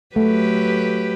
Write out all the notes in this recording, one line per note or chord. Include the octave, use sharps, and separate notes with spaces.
F#3 A3 G4 B4